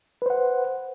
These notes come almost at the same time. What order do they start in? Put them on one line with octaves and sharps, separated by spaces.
B4 C5 F#5